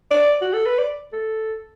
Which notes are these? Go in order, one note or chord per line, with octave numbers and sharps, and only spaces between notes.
D5
F#4
A4
B4
D5
A4